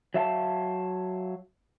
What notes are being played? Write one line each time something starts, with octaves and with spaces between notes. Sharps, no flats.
F#3 E5 F5 A5